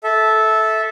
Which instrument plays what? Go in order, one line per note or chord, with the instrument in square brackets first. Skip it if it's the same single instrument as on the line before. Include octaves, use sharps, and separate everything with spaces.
[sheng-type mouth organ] A4 E5